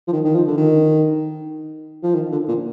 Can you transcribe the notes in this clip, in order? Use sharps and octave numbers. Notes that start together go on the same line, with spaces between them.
F3
D#3
D#3
F3
D3
D#3
F3
D#3
D3
A#2